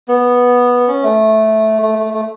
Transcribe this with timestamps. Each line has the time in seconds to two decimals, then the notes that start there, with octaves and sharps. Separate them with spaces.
0.08 B3
0.88 C#4
1.03 A3
1.82 A3
1.99 A3
2.14 A3